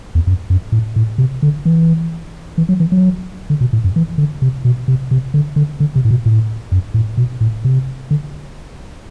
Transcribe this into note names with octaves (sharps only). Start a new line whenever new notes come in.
E2
F#2
F#2
A2
A2
C3
D3
E3
E3
F#3
E3
F#3
D3
B2
A2
F#2
E3
D3
C3
B2
C3
C3
D3
D3
D3
C3
A2
B2
A2
F#2
A2
B2
A2
C3
D3